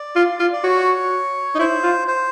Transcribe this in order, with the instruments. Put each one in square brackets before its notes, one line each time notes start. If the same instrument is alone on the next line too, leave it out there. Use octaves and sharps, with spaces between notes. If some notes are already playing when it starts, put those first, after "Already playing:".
Already playing: [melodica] D5
[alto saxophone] F4
F4
[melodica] D5
[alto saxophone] F#4 [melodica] C#5
[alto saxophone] D#4
[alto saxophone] E4 [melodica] C5
[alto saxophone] F4
[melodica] C5